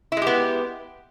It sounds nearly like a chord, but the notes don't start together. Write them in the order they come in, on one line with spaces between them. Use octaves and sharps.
E4 G#3 G4 B3